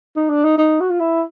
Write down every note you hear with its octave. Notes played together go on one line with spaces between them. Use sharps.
D#4
D4
D#4
D#4
F#4
F4
E4